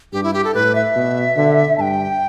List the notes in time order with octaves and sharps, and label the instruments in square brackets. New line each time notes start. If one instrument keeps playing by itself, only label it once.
[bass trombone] G2 [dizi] G4
[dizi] E4
G4
A4
[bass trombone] A2 [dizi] B4
[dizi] E5
[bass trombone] B2
D3
[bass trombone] G2 [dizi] G5 A5